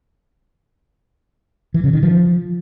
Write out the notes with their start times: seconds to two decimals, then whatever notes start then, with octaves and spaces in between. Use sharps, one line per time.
1.74 E3
1.84 C#3
1.93 D#3
2.03 F3